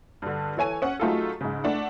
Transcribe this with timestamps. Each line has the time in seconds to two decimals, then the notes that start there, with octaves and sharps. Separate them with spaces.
0.22 G2 D3
0.57 E3 A4 C#5 G#5 D#7
0.82 C#4 F#5
1.00 F#3 A3 D#4 F4 G#4 A4
1.41 G#2 C#3
1.64 A3 D4 F#5